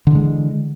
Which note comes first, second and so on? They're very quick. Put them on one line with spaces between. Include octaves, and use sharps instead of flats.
D3 E3 G#3